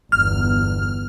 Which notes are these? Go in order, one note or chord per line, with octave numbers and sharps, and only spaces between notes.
G1 E2 F6